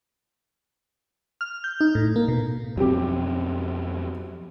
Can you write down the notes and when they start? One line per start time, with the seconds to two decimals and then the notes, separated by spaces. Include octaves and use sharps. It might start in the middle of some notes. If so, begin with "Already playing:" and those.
1.41 F6
1.64 G6
1.80 D#4
1.95 A2
2.16 A#3
2.28 B2
2.77 F2 B2 F#3 C4 G4